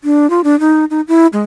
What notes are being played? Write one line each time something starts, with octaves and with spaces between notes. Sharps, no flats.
D4
F4
D4
D#4
D#4
E4
G#3